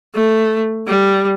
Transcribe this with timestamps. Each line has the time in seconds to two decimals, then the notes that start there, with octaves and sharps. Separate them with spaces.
0.15 A3
0.88 G3